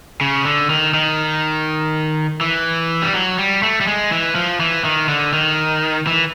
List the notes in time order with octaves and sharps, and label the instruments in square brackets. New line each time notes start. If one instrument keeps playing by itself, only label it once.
[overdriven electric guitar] C#3
D3
D#3
D#3
E3
G3
F#3
G3
A3
G3
G#3
E3
F3
E3
D#3
D3
D#3
E3